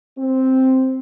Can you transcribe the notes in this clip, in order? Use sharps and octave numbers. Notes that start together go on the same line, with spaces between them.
C4